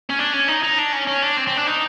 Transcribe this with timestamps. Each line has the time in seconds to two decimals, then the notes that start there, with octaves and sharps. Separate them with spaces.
0.10 C#4
0.19 D4
0.33 C#4
0.48 D#4
0.63 D#4
0.78 D4
0.93 C#4
1.08 C#4
1.23 D4
1.37 C4
1.47 C4
1.57 D4
1.67 D#4